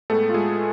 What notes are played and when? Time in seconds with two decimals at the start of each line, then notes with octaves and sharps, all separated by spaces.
0.10 A2 G#3 A3 B3 A4
0.29 F4
0.34 G#3 G#4